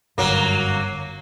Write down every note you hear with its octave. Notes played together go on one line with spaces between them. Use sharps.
G1 F#2 F#3 A#3